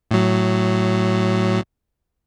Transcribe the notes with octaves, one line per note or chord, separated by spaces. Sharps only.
A2 F#3